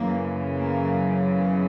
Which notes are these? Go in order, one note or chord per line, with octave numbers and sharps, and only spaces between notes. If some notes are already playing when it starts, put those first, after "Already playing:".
Already playing: F#2 C#3 E3 A#3
A#3
B3